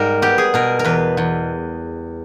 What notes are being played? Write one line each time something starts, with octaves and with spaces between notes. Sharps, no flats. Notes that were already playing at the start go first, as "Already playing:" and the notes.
Already playing: G#2 G3 A#4
B3 G4
G#4
B2 A#4
A#4
E2 B4
E2